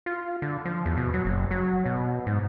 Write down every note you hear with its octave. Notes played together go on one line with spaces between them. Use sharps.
F4
D3
F3
E2
B2
F#3
F#1
F#3
B2
G#2